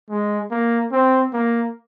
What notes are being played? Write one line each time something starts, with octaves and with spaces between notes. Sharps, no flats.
G#3
A#3
C4
A#3